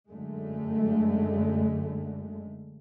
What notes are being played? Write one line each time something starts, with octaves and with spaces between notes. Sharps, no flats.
F#2 D3 G#3 A3